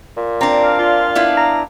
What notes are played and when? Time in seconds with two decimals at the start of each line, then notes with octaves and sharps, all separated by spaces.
0.17 A#2
0.41 C4 D4 A#5
0.63 F5
0.78 F4
1.15 B3 D4 E4
1.37 A#5